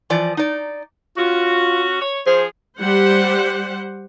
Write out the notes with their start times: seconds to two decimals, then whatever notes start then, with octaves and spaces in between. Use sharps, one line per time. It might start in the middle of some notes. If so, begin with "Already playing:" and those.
0.10 E3 F3 D5
0.37 D#4 D5
1.18 C#4 F4 F#4
2.01 C#5
2.27 F3 G#4 C5
2.79 G3 G4 C5 F#5